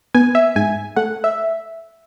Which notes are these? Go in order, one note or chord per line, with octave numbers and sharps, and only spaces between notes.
B3 G#5
E5
G#2 G#5
A3 F#5
E5